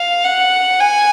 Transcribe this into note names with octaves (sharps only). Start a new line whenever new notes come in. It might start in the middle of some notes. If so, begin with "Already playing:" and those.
Already playing: F5
F#5
G#5